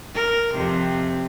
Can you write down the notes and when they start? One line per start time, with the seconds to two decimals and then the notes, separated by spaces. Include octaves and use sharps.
0.15 A#4
0.54 F2 C3